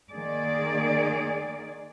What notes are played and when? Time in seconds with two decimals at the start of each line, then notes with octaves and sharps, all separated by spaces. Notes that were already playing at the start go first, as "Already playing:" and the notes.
0.12 D#3 A#3 G#4 D5